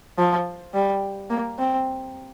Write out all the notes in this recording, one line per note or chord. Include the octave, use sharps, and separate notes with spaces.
F3
G3
A#3
C4